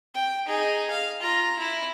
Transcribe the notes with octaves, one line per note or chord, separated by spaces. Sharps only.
G5
D#4 G#4
F5
F4 A#5
E4